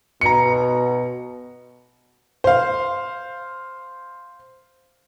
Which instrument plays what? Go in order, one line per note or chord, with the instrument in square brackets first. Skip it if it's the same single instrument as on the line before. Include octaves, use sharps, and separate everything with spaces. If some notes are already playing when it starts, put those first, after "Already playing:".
[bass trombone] B2 [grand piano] A#5 C#7
[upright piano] C5 F5